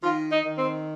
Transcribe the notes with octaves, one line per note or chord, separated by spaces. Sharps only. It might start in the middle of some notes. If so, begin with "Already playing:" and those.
D#3 F4
D#4
D#3
C4